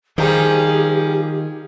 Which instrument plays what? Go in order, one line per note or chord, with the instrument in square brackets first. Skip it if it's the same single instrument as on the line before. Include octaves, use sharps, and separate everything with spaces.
[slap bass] D#3 [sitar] F3 G3 D#4 [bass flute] G4 [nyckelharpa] G#4